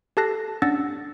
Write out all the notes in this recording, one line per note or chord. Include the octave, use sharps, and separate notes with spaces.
G4 A4 A5 F#6 A#6 C7
C#4 D4 F#5 E6 A6 A#6